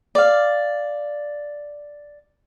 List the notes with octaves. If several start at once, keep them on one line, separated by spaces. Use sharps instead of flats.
D5 F5